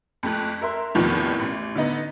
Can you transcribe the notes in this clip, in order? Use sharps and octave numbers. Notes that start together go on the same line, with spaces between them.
F2 A3 F#6
A#4 E5 C6
E2 A2 C3 D#3 F3 B3
A1
D3 B3 D#4